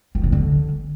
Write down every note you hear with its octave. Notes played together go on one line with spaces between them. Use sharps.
E2
C3
D3